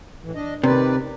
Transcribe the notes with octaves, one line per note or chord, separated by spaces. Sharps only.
A2 E3
D4 D#5
C3 D#3 B4 D5